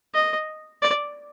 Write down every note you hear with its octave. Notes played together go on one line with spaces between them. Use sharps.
D#5
D5